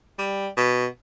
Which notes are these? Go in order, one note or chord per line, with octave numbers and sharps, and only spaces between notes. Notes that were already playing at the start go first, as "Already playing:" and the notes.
G3
B2